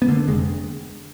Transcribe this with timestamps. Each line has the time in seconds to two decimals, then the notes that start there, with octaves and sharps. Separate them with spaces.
0.02 B3
0.08 D3 A#3
0.28 F1 G#3